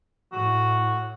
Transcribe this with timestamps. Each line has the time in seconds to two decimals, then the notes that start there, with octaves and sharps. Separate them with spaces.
0.33 A2 F#4